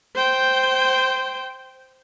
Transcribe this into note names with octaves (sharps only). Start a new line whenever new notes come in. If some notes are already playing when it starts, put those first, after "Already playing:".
C5 G5